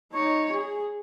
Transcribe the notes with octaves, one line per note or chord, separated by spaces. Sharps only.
D#4 C#5
G#4